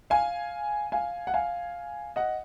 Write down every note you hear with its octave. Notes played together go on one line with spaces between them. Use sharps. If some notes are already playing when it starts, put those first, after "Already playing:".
F5 G#5
F5 G#5
F#5
F5 G#5
D#5 F#5